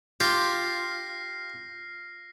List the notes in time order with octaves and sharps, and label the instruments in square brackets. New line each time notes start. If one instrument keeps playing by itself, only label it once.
[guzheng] F4 [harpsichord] G4 [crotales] F6 A#6 C7